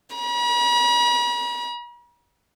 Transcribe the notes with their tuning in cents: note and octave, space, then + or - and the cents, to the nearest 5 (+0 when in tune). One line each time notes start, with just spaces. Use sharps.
B5 -45